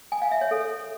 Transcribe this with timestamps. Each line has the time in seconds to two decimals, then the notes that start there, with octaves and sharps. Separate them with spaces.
0.12 G#5
0.22 F5
0.32 E5
0.41 C#5
0.51 A4